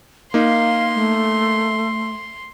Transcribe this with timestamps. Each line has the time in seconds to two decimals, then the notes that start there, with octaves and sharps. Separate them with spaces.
0.34 A#3 D#4 F5 C6
0.95 A3